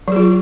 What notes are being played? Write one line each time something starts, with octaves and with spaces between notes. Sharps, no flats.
F#3 F4 G#4